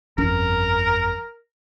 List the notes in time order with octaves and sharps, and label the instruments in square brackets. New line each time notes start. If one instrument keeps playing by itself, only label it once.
[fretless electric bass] G1 F2 C#4 [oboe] A#4